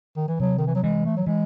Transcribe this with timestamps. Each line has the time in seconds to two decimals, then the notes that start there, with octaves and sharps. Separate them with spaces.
0.17 D#3
0.28 E3
0.40 C3 F#3
0.58 D#3
0.67 E3
0.75 F#3
0.83 E3 G#3
1.05 A3
1.17 F#3
1.27 E3 G#3